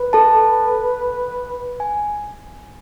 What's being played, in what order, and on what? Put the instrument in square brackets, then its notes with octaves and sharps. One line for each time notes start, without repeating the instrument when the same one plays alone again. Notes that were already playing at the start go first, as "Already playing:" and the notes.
Already playing: [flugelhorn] B4
[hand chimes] A4 A5
G#5